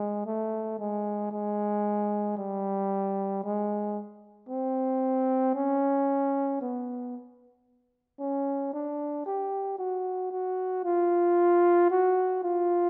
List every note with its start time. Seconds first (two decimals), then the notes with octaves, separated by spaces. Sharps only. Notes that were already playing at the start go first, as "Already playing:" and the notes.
Already playing: G#3
0.26 A3
0.79 G#3
1.31 G#3
2.37 G3
3.44 G#3
4.49 C4
5.55 C#4
6.62 B3
8.20 C#4
8.73 D4
9.26 G4
9.79 F#4
10.31 F#4
10.84 F4
11.91 F#4
12.43 F4